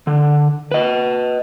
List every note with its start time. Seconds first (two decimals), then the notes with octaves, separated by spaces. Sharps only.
0.07 D3
0.72 B4 D#5